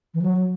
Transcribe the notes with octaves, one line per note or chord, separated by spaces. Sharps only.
E3
F#3